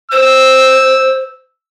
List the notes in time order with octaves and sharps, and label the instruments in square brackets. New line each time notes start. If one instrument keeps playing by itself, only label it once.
[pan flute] C5 [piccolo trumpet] E6